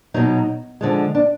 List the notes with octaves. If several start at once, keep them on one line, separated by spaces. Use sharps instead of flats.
B2 F#3 D#4
D3 F3 G#3
D4